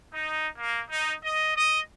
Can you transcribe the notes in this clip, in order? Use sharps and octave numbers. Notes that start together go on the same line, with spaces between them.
D#4
A#3
D#4
D#5
D#5